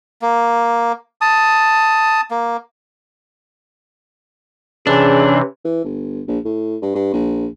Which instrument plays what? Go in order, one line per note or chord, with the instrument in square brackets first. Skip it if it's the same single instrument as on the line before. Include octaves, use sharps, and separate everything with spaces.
[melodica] A#3
A5 D#6
A#3
[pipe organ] C3 E3 [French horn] C#4 [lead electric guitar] D4 [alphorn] G#4
[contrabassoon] E3
G1
A#1
A2
G2
G2
A#1